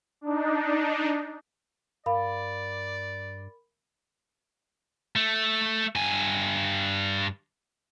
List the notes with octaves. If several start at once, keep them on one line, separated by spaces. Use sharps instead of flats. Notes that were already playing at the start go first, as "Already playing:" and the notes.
D4 D#4
G2 A#4 D5 F5 B5
A3
G2 G#5